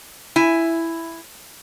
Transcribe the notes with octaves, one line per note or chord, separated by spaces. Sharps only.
E4 G#5